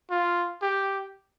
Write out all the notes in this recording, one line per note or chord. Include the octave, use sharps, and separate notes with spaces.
F4
G4